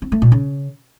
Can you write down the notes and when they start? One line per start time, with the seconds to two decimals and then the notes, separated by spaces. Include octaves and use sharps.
0.02 C4
0.12 A3
0.22 A#2
0.32 C#3